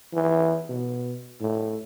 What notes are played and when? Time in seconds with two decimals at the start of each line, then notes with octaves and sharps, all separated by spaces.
0.14 E3
0.69 B2
1.41 A2